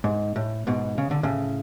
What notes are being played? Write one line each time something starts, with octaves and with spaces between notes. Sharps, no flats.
G#2
A2
G#2 B2
C#3
D3
A2 C#3